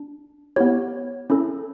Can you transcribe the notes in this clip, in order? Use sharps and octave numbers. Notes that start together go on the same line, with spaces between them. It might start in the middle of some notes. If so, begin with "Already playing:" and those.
Already playing: D4
B3 E4 G4 C#5
C#4 E4 A4